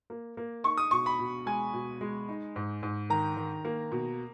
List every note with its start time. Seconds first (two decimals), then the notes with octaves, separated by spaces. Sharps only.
0.10 A#3
0.37 A#3
0.64 D#4 C#6
0.77 D#6
0.91 B2 C#6
1.06 B5
1.19 B2
1.46 G#3 G#5
1.74 B2
2.01 G#3
2.29 D#4
2.56 G#2
2.83 G#2
3.10 D#3 A#5
3.37 D#3
3.65 A#3
3.92 B2